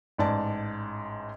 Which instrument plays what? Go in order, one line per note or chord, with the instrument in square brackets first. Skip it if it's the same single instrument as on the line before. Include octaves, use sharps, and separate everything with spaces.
[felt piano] A1 G#2 D5 A5